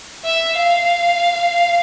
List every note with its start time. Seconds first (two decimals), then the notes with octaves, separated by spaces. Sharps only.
0.25 E5
0.57 F5